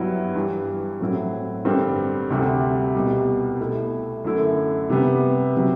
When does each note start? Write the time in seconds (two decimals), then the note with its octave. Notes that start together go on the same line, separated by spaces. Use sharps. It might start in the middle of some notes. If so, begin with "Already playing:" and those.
Already playing: G2 F#3 B3 E4
0.35 G2 E3 G3
1.00 A2 F#3 C4 E4
1.65 G2 D3 G3 C4
2.30 D2 C3 G3
2.95 C2 B2 G3
3.60 B2 A3 E4
4.24 F#2 D3 A3 E4
4.90 C3 G3 B3
5.56 C3 F#3